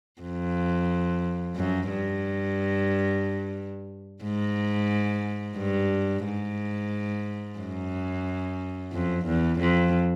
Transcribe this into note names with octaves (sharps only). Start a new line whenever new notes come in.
F2
F#2
G2
G#2
G2
G#2
F#2
F2
E2
F2